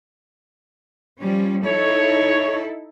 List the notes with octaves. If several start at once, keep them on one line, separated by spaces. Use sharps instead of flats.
F3 G3 C#4
D#4 E4 A4 C#5